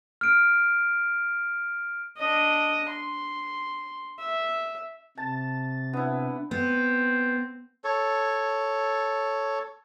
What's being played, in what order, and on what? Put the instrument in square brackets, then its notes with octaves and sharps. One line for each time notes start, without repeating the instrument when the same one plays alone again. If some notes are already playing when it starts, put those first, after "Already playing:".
[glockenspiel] F6 D7
[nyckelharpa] D4 D#5
C6
E5
[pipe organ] C3 [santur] A5 [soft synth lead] A6
[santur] B3 E4 [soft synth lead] D4
[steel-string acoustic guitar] B3 [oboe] C4
[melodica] A4 C#5